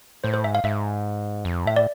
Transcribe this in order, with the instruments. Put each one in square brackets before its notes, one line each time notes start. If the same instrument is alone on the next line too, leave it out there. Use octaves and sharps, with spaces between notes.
[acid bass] A2 [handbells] C5
[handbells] C5
[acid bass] G#2 [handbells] E5
[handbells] F5
[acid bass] G#2 [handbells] E5
[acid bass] F2
[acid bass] A2 [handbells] E5
[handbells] D5